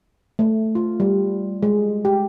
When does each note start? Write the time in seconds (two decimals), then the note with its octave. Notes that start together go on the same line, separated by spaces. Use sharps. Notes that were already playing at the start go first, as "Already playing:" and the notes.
0.39 A3
0.75 F4
1.00 G3
1.63 G#3
2.05 G4